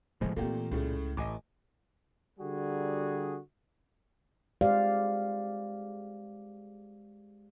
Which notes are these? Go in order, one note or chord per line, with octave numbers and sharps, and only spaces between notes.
A2 C#3 F3 G#3 B3
A#2 E3 A3 A#3 C4 G4
C#2 A2 C#3 A3
A1 D#5 G#5 D6
D3 G3 F#4 G#4
G#3 G4 C5 D5 F5